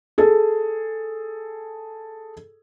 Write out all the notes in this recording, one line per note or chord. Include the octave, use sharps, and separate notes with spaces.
G#4 A4